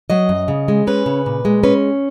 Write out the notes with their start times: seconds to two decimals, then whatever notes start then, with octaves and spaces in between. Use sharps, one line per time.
0.10 F#3 D#5
0.29 F#2
0.48 C#3
0.68 G#3
0.87 C#4 B4
1.06 C#3
1.26 A#2
1.45 G#3
1.63 C#4 B4